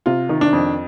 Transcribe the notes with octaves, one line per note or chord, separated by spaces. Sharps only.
C3 F4
D#3
D4
F2